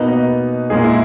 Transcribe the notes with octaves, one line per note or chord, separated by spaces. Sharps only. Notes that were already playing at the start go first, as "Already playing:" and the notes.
Already playing: B2 A#3 D#4 B4
D#5
A#2 G#3 D#4 G#4
E4